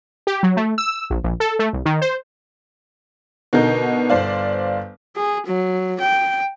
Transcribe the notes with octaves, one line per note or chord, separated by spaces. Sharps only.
G4
F#3
A3
E6
A#1
A#1
A4
A3
C2
D#3
C5
B2 D3 D#4 A#4 G6
G1 C5 D5 F5
G#4
F#3
G5